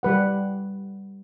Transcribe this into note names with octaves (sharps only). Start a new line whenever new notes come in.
G3 B4 F#5